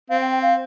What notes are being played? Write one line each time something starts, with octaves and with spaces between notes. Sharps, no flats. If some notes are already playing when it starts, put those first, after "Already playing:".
C4 F5
G5
G5
F5